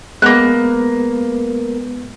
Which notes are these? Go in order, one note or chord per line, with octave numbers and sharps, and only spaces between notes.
G#3 A#3 B3 B4 F#6